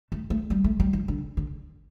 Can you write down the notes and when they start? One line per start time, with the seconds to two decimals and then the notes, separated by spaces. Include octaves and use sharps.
0.12 A3
0.30 A3
0.50 G3
0.64 A3
0.80 G3
0.93 F3
1.08 D3
1.37 D3